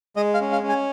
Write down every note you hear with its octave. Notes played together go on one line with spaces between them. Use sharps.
G#3 D#5
F5
C#4
F5
C#4
G#5